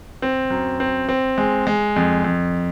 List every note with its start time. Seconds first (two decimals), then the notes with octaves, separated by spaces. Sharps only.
0.22 C4
0.50 F#2
0.80 C4
1.09 C4
1.38 G#3
1.67 G#3
1.96 F2
2.24 F2